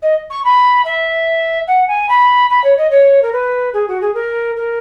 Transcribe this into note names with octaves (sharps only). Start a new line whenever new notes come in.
D#5
C#6
B5
E5
F#5
G#5
B5
B5
C#5
D#5
C#5
A#4
B4
G#4
F#4
G#4
A#4
A#4